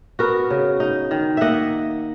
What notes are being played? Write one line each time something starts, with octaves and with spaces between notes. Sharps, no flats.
B3 F#4 A#4
C#3
D#4
D#3
A#3 D#5 E5 F#5